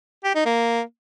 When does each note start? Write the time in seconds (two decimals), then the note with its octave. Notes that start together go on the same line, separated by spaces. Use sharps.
0.24 G4
0.35 D#4
0.46 A#3